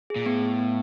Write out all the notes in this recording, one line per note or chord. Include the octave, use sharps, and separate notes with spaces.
G#4
A#2
A2 B3
B3
B3